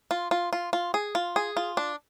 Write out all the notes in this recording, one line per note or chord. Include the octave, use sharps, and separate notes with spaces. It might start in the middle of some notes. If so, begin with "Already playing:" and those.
F4
F4
F4
F4
G#4
F4
G#4
F4
D4